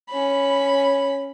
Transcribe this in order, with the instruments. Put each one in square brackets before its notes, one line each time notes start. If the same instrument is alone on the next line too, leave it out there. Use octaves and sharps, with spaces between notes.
[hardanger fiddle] C#4 B5